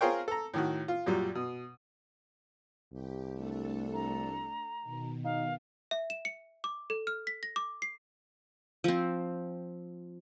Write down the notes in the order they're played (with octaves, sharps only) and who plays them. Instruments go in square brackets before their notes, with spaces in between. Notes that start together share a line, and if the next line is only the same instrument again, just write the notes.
[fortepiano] F4 G#4 A#4 C5 C#5 G5
A4 A#5
A2 D#3 F#4
F4
F#2 A#2 F#3 G3
B2
[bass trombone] C2 [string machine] G4
[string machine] A3 D4 A4
[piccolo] A#5
[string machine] B2 D#3
[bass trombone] D#4 [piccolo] F5
[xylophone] E5
E7
C#7
D6
A4
F6
B6
A#6
D6
C7
[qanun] F3 C4